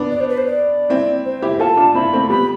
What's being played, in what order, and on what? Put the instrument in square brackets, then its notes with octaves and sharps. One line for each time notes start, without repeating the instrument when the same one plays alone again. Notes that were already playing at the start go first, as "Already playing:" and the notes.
Already playing: [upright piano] B3 D4
[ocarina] D5
C5
B4
C5
D5
[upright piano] C4 E4
[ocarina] C5
[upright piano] E4 G4
[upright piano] F4 A4 [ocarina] A5
[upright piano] D4 F4
[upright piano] C4 E4 [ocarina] B5
[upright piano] A3 C4
[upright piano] G3 B3 [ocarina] B5